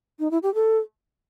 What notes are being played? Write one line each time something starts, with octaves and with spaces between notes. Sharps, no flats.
D#4
E4
G4
A4